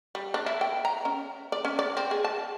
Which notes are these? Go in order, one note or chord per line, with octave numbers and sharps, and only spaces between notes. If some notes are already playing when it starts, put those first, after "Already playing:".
G3
D4
E4
G5
A#5
C#4
D5
C#4
D5
C4
G#4
A5